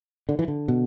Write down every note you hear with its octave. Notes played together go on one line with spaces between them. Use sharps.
D3
E3
D3
B2